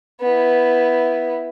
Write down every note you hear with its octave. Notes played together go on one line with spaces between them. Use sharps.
B3 E4